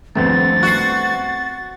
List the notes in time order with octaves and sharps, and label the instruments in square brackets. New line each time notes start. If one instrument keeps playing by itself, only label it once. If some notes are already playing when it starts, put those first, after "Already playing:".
[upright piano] D#1 A#1 [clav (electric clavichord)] A3 B3 C4 [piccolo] A6
[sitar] F#4 [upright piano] F#6 C7